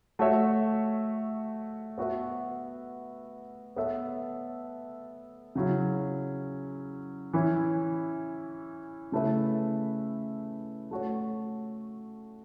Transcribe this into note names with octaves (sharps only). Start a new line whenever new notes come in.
A3 F#4 C#5 E5
B3 F#4 B4 E5
B3 A4 C#5 E5
C#3 F#3 C#4 E4
E3 C#4 E4
C#3 A3 E4 B4 E5
A3 F#4 C#5